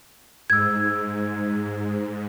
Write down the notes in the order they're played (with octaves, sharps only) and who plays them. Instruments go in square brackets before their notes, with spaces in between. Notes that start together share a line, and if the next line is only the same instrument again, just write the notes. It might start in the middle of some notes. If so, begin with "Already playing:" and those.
[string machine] G#2 [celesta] E6 G#6